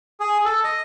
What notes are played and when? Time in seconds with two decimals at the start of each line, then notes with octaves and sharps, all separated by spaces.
0.20 G#4
0.45 A4
0.64 D#5